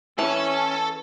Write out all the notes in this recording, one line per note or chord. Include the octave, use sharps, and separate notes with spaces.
E3 C#4 A4